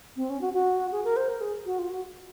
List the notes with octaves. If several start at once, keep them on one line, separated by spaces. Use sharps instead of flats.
C4
C#4
F#4
F#4
G#4
A#4
C5
A#4
G#4
F#4
F4
F#4